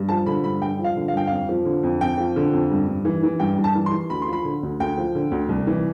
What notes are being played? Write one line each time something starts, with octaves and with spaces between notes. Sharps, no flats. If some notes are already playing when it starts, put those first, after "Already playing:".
Already playing: G2
F3 A5
D3 B5
G2 B5
G2 G5
F3
F5
D3
F5
G2 G5
F2 F5
F3
D3
F2
F2 G5
F3
D3
F2
G2
G2
E3
E3
G2 G5
G2
A5
E3
C6
E3
D2 B5
C6
F3 B5
D3
D2
D2 G5
F3
D3
D2
C2
E3